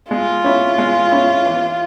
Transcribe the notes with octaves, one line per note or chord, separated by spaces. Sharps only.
G#3 F4
C#4 E4
G#3
C#4 E4
E3